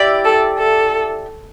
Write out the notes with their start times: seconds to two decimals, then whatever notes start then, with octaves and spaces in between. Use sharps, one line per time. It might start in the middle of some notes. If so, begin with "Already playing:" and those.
Already playing: E4 G4 D5
0.25 A4
0.58 A4